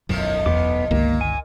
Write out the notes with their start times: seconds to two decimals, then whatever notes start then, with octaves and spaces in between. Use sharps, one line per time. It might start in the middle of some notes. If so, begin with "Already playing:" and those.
0.09 E1 B1 F#2 A2 D#3 F3
0.46 E2 B3 D6
0.91 G1 C#2 A#2 D#3 G#3 A#3
1.21 G#5